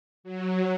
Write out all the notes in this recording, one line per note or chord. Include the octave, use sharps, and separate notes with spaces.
F#3